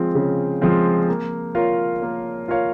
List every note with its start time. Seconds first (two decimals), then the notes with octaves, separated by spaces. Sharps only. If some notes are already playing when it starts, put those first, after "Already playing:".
Already playing: F3 G#3 C4 F4
0.15 C#3
0.61 F3 G#3 C4 F4
1.08 A#3
1.55 F4 A#4 C#5 F5
2.02 A#3
2.48 F4 A#4 C#5 F5